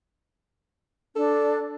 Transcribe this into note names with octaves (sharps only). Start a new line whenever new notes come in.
D4 A4